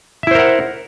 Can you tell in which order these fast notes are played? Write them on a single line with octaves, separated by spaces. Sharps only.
E5 E4 C5 A#4 F#5